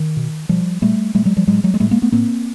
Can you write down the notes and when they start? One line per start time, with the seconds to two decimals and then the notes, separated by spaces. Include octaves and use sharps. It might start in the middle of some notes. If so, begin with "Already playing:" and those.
Already playing: D#3
0.17 B2
0.49 B2 F3 G3
0.82 A#2 G3 A3
1.15 A#2 G3 A3
1.25 F#3 G#3
1.37 F3 G3
1.47 A2 F#3 G#3
1.64 F#3 G#3
1.74 G#3
1.80 A2 G3 A3
1.91 G#3 A#3
2.02 A3 B3
2.12 A2 A#3 C4